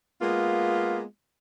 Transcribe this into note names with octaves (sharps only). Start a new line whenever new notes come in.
G#3 A#3 B3 F4